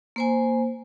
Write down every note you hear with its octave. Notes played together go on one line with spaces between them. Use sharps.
A#3 C5 G#5